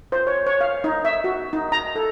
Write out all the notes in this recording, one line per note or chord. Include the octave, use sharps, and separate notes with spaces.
C5
C#5
C#5
F5
D#4
E5
F#4
D#4
A#5
A4